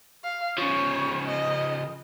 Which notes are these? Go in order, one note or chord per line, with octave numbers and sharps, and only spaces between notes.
F5
C#3 F3 C#5
D#5